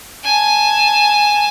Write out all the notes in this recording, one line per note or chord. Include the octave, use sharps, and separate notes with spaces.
G#5 A5